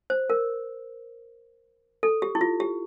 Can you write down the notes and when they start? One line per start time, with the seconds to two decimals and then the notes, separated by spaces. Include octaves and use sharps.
0.10 C5
0.30 A#4
2.03 A4
2.22 G4
2.35 E4
2.41 F4
2.60 G4